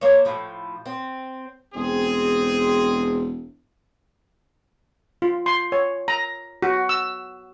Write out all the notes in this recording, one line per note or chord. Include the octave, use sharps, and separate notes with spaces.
A#3 C5 C#5
A2 F3
C4
E1 C4 G#4
F4
C6
C#5
A#5
F#4
E6